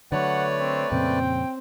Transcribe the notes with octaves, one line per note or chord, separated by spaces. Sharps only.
D3 F#3 A3 B4 C#5 D5 F#5
C4
F2 A#2 C#3 C4 G5